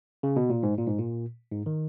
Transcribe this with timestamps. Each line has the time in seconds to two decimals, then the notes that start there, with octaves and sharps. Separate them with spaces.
0.23 C#3
0.36 B2
0.50 A#2
0.63 G#2
0.78 A#2
0.87 G#2
0.98 A#2
1.51 G#2
1.66 D#3